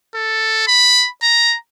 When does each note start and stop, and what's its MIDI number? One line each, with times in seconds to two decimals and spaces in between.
0.15 0.64 69
0.67 1.08 83
1.23 1.55 82